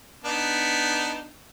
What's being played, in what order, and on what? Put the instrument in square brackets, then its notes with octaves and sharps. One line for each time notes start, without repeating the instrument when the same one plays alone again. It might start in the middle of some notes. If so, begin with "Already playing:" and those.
[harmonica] B3 D4 D#4